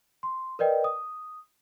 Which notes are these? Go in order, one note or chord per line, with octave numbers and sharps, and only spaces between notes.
C6
A#4 B4 D5 D#5 G5
D#6